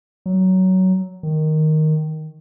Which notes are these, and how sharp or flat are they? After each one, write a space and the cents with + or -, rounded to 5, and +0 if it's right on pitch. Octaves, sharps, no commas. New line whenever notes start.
F#3 +15
D#3 +0